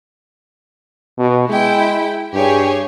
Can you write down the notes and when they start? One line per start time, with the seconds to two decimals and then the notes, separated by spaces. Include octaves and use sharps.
1.18 B2
1.49 G#3 E4 G5
2.34 G2 G4 G#4 C#5